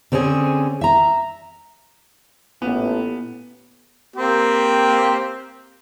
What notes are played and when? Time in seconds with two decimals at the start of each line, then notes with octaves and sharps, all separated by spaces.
0.12 D3 C4 C#4 G4 G#4
0.81 E5 A#5
2.62 A1 A#2 B3
4.16 A#3 C4 G4